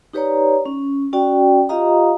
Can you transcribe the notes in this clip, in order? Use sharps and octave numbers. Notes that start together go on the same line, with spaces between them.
D#4 G4 B4 C#5 D5 A#5
C#4
C#4 F#4 D5 G5
F4 G4 D#5 F5 A#5 D#6